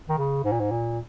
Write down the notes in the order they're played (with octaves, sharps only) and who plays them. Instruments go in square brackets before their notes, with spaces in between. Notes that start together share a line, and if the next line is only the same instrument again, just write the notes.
[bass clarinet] D#3
C#3
G#2
A#2
G#2
A#2